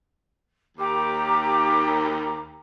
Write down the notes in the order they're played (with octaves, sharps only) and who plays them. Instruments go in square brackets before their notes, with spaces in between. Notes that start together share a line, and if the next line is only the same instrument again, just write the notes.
[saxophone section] D#2 [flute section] G4 A#5 D6